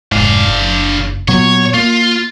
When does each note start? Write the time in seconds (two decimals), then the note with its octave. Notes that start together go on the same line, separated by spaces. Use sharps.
0.12 F1 G#2 D4 F5
0.46 F#1
1.28 A#2 F#3 B3 C#5
1.74 A#3 F4